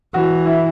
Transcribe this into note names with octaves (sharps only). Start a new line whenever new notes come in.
E3 F#4
E4